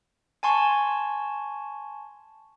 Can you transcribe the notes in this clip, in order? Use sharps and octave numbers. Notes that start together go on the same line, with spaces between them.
G#5 A5 C6 C#6